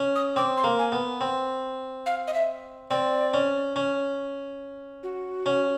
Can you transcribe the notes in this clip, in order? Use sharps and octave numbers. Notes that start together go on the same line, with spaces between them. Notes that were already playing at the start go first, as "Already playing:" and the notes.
Already playing: C#4
D#6
C4 D6
C6
A#3
G#5
B3
C4
F5
D#5
E5
C4 D5
C#4
C#4
F#4
C#4